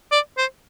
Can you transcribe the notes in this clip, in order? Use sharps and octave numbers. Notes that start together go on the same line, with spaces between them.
D5
C5